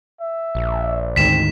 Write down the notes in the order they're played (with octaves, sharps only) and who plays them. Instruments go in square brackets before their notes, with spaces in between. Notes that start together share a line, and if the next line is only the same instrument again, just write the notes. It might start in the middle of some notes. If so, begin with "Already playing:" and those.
[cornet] E5
[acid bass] A#1
[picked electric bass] D2 G#2 D#3 [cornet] C4 [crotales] B6 E7